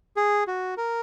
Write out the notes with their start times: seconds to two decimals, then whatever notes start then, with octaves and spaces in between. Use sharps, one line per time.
0.17 G#4
0.47 F#4
0.77 A#4